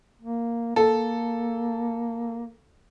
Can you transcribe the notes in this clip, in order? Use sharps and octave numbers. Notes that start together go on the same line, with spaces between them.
A#3
A#3 A4